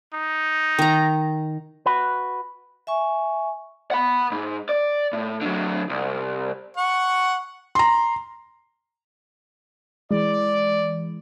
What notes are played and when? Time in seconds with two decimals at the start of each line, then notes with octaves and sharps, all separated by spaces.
0.14 D#4
0.79 D#3 A#5
1.86 F#4 B4
2.87 E5 G#5 C#6
3.91 F#5 B5
4.32 G#2
4.69 D5
5.13 A2
5.41 D3 F#3
5.89 C2
6.77 F#5 C#6
7.75 A#5 C6
10.11 E3 G#3 D5